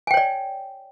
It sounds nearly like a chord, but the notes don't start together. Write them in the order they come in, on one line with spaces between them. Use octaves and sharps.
G#5 G5 C#5 D5